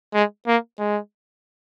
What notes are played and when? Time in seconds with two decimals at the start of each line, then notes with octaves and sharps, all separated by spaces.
0.14 G#3
0.47 A#3
0.79 G#3